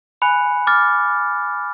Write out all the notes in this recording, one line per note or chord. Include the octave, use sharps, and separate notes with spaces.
G#5 B5 F#6 C#7
D6 F6 A6